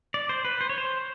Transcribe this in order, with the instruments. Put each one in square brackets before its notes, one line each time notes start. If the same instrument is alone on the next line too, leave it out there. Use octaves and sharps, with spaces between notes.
[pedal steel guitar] D5
C5
B4
C5
C#5
C5